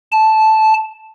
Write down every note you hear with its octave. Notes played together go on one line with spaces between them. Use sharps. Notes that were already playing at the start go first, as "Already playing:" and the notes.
A5